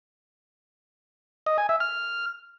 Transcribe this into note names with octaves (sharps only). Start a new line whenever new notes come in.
D#5
G#5
E5
F6